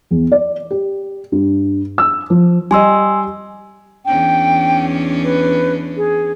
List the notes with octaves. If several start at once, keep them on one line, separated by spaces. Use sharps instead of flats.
E2
D5
G4
G2
E6
F3
G3 D#5 G#5 C6 E6
E2 C#4 D4 G5
B4
G#4